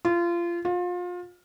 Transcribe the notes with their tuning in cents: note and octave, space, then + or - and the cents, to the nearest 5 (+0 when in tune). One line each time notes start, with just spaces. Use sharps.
F4 -25
F4 +30